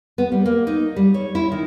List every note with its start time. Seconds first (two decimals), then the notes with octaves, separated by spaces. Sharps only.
0.18 B3
0.32 G3
0.46 A#3
0.67 D#4
0.96 G3
1.14 C#5
1.35 E4
1.52 D#3